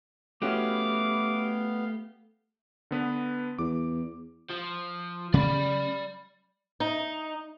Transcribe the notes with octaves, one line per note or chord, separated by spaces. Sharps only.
A3 B3 C#4 E4 F#4 G4 F5 D6
D3 B3 B4
E2 D6
F3
C#3 C#4 D5 B5
D#4